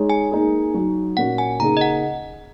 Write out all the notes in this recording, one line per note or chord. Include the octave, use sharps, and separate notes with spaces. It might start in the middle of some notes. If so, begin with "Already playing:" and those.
Already playing: G#3 D#4 G#4 C#5
G#5
A#3 D#4 G#4
F#3 D#4 F#4
A#2 A#3 C#4 F#4 F#5
G#5
C#3 A#3 D#4 G#4 A#5
D#5
F#5